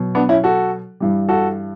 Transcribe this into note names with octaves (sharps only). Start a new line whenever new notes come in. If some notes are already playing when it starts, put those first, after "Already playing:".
Already playing: B2 F#3
B3 D4
C#4 E4
F#4 A4
G2 E3 G3
F#4 A4